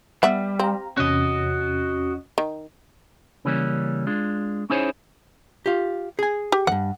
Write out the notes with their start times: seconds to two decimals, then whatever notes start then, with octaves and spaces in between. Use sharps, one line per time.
0.23 G3 B3 E5 F#5
0.59 C4 G4 F5 A#5
0.97 E2 C3 C#4 F#4 D#5
2.38 D#3
3.45 C#3 E3 G3 A#3 C#4
4.07 G#3 D4 F4
4.70 C#4 D#4 E4 G#4 C5 C#5
5.66 F4 G4
6.19 G#4 G#5
6.52 G4
6.67 E2 G2 F#5